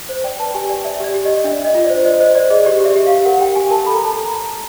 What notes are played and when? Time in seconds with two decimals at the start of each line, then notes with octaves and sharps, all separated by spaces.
0.09 C5
0.24 D5 G5
0.40 B4 A5
0.54 G4 G#5
0.69 D5 G5
0.85 D5 E5
1.00 G4 D5
1.14 G4
1.25 D5 D#5
1.44 D4 E5
1.59 D4
1.65 D#5
1.75 F4
1.84 D5
1.90 C5
2.05 C5 D#5
2.20 C5 D#5
2.35 C5 D5
2.50 G#4 D#5
2.65 G4 D5
2.81 G4 E5
2.96 G4
3.06 G4 F5
3.25 A#4 F#5
3.41 G4 G5
3.56 G4 G#5
3.71 A#4 A5
3.86 A4 B5
3.95 A#5
4.01 A4 A5
4.12 A#5